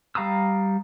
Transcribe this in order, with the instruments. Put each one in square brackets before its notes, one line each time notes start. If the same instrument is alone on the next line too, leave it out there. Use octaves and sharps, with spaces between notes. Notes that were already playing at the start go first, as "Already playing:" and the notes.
[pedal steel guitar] G3 F5 A#5 D#6 E6